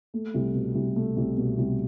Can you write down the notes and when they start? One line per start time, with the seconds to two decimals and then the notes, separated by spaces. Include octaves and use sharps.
0.14 A3
0.34 C2
0.55 B2
0.75 C2
0.96 A3
1.17 C2
1.38 B2
1.58 C2